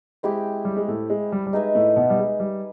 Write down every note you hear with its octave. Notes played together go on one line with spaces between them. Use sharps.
G#3 C4 E4 G4
G3
G#3
A2 A3
G#3
G3
G3
G#3 D#4 G#4 B4 E5
A2 A3
B2 B3
G3
G#3
G3